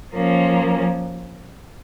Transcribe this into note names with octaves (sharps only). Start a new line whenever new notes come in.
F3 A#3 C#4